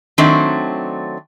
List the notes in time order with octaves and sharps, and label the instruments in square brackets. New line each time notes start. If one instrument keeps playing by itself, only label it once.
[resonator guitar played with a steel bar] D#3 F#3 A3 C4 D4